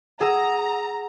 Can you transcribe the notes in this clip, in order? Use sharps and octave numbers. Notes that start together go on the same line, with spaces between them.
G#4 F#5 A#5 D#6 E6